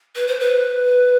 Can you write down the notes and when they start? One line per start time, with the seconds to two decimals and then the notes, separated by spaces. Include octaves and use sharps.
0.15 B4
0.28 C5
0.40 B4